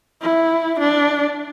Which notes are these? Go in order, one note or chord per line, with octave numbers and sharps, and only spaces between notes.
E4
D4